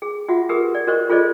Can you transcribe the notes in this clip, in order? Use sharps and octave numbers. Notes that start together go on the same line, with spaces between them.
G#4
F4 F#4 E5 F#5
G4 G#4 A#4 B4
D5
F#4 A#4 C5 D#5 C#6
F4 G#4 A4 C5 D5 D#5